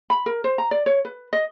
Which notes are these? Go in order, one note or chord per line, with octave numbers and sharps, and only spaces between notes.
B5
A#4
C5
A#5
D5
C#5
B4
D#5